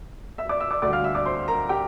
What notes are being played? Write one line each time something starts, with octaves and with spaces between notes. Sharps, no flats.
E5 E6
D5 D6
E5 E6
D5 D6
D2 D3 G3 D5 D6
F5 F6
E5 E6
D5 D6
C5 C6
A#4 A#5
G4 G5